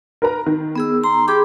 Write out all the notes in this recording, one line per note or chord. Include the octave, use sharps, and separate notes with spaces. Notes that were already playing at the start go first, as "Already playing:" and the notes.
A#4 B4 A#5
D#3
B3 G#4 E6
A#5 C6
G4 G#4 B5 D6